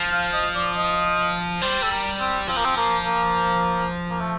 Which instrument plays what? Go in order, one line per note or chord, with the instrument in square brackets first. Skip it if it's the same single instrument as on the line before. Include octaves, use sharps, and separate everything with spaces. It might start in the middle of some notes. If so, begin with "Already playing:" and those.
Already playing: [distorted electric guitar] F3
[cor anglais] F5
D#5
D5
D#5
[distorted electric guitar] G3 [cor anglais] C5
[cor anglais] A4
A#4
C4
[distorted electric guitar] F3 [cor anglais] C4
[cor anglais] A#3
C4
A#3
A#3
A#3
A3